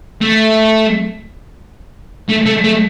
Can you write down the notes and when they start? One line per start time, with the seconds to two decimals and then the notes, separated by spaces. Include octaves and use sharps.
0.22 A3
2.30 A3
2.46 A3
2.65 A3